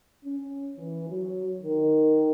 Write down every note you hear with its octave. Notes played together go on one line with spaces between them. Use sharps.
C#4
E3
F#3
D#3